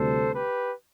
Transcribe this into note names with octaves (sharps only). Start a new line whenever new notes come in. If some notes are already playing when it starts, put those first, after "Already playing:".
Already playing: D2 C3 G3 A4 C5
G4 B4